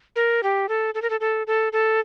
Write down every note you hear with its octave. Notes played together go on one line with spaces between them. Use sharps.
A#4
G4
A4
A4
A#4
A4
A4
A4
A4